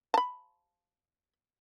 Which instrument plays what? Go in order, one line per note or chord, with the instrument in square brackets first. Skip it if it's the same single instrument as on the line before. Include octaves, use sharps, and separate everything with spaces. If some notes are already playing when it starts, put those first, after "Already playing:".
[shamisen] A5 B5